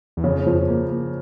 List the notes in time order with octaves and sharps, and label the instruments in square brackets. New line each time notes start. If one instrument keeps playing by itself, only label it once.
[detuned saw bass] E2
[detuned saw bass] F2 [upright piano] C#3
[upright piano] F3
A#3
A#3